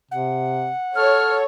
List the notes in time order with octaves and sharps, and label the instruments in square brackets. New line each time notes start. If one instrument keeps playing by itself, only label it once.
[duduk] C3 [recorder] F#5
[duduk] A4 [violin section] C#5 [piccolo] F6